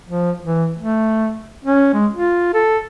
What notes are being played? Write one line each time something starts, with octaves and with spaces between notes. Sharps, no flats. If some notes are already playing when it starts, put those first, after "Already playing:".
F3
E3
A3
C#4
G#3
F4
A4